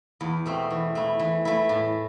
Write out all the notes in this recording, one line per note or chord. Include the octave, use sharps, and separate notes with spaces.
E2
B2 A3 C4
E3
A3 E4
E3
A3 E4
A2